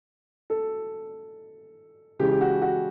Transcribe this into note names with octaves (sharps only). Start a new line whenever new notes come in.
A4
C#3 E3 G#3 G4
G4
F#4
F#4